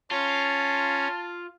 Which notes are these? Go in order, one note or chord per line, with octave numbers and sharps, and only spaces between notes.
C#4 F4 A5